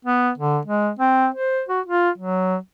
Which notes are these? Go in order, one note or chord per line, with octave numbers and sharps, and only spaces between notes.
B3
D3
G#3
C4
C5
F#4
F4
F#3